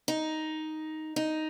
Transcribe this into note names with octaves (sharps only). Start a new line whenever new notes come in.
D#4
D#4